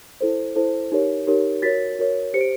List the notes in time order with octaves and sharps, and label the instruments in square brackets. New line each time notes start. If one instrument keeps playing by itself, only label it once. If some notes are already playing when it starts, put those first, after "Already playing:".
[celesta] E4 A4 C5
E4 A4 C5
D#4 G4 A#4 C#5
D#4 G4 A#4 C#5
F#4 A#4 C#5 A6 B6
F#4 A#4 C#5
G4 C5 C#7
D7